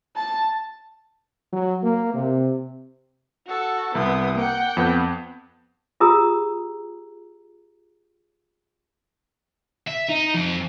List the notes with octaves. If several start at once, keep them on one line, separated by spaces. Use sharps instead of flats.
A5
F#3
A#3
C3
F#4 A4
C2 B3 D#6
A#3 F#5 G5
F2 B3 G6
F4 G4 G#4 A#5 D#6 E6
E5
D#4
F2